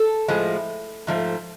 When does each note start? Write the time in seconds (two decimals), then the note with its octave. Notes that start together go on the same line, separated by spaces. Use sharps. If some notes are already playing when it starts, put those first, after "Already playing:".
Already playing: A4
0.28 A2 F3 G#3
1.07 G#2 F3 A3